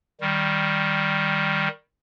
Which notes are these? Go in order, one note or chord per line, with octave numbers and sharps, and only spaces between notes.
D#3 G3